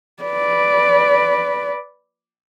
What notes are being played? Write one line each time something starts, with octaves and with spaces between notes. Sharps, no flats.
B4 D5